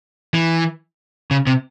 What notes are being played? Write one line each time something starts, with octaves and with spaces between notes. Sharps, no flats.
E3
C#3
C3